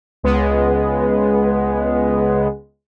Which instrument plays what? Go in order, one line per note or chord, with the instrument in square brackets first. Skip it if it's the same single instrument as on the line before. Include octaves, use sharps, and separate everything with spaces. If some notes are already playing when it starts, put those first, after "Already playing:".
[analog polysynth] C#2 G#3 B3